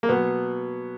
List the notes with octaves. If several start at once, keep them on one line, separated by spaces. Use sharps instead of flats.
A#3
B2 F#3 B3